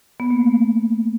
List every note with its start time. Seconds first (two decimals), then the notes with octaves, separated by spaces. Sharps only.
0.20 B3
0.31 A#3
0.41 A3